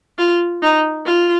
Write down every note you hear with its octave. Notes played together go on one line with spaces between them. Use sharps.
F4
D#4
F4